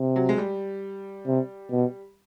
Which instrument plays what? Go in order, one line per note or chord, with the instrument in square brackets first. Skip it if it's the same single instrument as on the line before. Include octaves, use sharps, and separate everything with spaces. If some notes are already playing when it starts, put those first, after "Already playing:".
Already playing: [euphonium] C3
[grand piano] F#3
G#3
G3
[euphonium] C3
B2